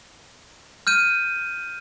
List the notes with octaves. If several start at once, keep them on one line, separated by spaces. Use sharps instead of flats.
F6 G6 D#7